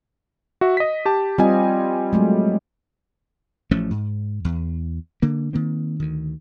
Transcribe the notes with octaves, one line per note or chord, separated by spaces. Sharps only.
F#4 E5
D#5 B6
G4 A5
G3 C4 F4 D#5 G#5
F#3 G#3 A3
A1 F3 A3 C#4
G#2
E2
D3 A#3
D#3 A#3 C4
D2 D#3